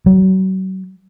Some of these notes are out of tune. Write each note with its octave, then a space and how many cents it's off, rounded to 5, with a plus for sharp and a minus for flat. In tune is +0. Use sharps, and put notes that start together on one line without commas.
F#3 +35